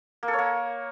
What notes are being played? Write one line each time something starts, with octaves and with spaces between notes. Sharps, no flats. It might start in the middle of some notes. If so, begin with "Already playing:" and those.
A#3
A4
C#5
A#3